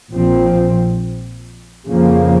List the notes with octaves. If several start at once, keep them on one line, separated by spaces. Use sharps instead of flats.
A#1 A#2 F3 C4
F2 C#3 F3 A#3